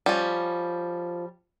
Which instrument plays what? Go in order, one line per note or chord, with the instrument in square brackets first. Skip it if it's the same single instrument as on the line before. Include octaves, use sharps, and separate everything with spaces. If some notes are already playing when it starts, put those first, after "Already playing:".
[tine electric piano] F3 A6 [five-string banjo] G3 C#4